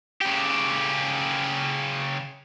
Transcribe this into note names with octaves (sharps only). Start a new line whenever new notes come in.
C#3 G4